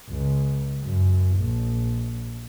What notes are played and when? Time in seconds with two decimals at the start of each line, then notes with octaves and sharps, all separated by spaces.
0.10 C#2
0.84 F#2
1.37 A#1